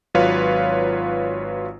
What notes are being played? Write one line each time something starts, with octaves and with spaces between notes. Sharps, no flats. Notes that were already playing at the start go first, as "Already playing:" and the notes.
G#1 F#3 F4 B4 C#5 F5